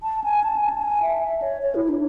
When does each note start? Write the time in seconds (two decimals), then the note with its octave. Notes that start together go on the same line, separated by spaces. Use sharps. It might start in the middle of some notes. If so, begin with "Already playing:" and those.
0.03 A5
0.24 G#5
0.44 A5
0.56 G#5
0.70 A5
0.82 G#5
1.02 E5
1.23 E5
1.42 C#5
1.62 C#5
1.75 E4
1.89 D4